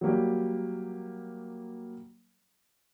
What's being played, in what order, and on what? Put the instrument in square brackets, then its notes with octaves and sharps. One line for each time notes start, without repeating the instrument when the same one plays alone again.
[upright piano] F#3 G3 A#3 G4